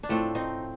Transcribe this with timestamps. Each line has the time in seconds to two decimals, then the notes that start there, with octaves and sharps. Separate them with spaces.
0.03 D4
0.09 A2 F3 A3 C4
0.35 C4 D#4